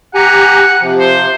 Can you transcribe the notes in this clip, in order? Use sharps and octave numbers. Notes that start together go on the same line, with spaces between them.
G4 F#5 G#5 A#5
C3 F3
C5